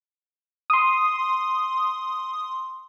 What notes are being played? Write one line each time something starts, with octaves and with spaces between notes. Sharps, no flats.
C6 D#6